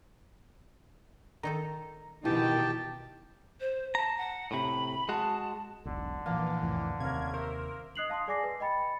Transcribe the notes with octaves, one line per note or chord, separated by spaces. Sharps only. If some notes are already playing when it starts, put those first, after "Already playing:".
D#3 D#4 A4 A#5
B2 D#3 E3 E4 G4 G5 A5
C5
A5 A#5
F#5
A2 C3 B5
G#3 F#4 A5
E1 B1 D3
A#2 E3 F3 A#3 D4
C2 F2 A2
D#2 C3 A#3 C#4 A#4 G#6
A#4 C5 E5
D#5 D#6 F#6 C7 F7 F#7
F5 A5 C6 D#6
G#4 D5 G#5 D6 A#6 C7
B4
D#5 G5 B5 A6 C#7